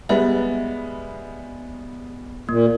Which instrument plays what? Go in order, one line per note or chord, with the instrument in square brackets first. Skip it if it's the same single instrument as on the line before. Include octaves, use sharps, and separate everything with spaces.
[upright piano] G3 G#3 B3 [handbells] E5
[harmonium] A#2 [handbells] A#3